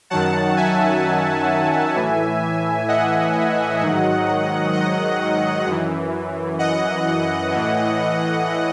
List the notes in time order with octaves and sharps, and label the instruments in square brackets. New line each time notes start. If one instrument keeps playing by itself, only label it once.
[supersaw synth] F#2 D#3 F#3 F#5 A5
E5 G#5
A2 E3
D#5 F#5
G#2 D#3 F#3
D#5
F#2 E3
D#5 F#5
A2 E3